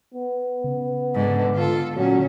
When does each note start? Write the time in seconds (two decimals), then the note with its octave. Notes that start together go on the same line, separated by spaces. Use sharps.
0.14 B3
0.64 C#3
1.14 G#2 D3
1.54 D3 F4 A4
1.96 A#2 F#3 C#4